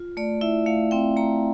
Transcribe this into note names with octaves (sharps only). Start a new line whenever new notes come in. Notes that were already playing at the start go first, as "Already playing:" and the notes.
Already playing: F4
A3 D5
E4 E5
A3 F5
C4 G5
A3 A#5